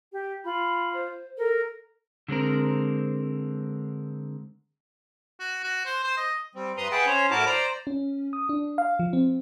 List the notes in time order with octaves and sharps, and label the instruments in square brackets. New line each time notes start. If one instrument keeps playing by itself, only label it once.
[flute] G4
[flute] F4 [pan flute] B5
[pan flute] C5
[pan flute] A4 [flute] A#4
[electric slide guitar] D3 G#3 C4 A#4
[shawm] F#4
F#4
C5
C5
D#5
[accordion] G3 C4
G2 B4 A#5 C6 D#6
G#4 B4 E5 F#5 G5 A5
C#4 C5 C#5
A2 E4 F#4 A#4 A5 D6
C5 D5 A#5
[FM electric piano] C#4
D#6
D4
F5
F3
C4